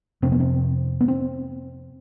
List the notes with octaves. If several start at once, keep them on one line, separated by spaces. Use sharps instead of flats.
F2 C3 C4
B3
C4
B3
C4